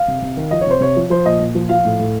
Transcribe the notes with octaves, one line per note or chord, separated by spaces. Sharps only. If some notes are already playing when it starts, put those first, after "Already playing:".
Already playing: F5
C3
C3
D#3
F3 D#5
C#5
C3 C5
C3 C#5
F3
F3 C5
A#2 D#5
A#2
F3
F3 F5
A2
A2